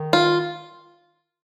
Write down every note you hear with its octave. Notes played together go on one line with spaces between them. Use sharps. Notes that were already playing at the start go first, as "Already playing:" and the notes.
Already playing: D#3
F4